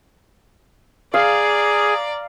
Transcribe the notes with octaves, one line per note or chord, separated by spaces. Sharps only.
G#4 D5 F5 A#5